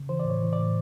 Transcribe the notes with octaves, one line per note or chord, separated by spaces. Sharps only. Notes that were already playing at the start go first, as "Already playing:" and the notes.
Already playing: C#3
E3 C5
D5
A2
C#5
E3
D5
A2